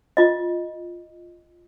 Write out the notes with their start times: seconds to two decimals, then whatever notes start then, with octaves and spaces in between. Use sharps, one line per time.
0.17 F4 D#5